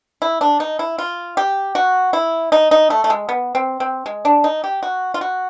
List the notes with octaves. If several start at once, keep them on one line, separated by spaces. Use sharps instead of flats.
E4
D4
D#4
E4
F4
G4
F#4
E4
D#4
D#4
A3
A3
G#3
B3
C4
C4
G#3
D4
D#4
G4
F#4
F4
F#4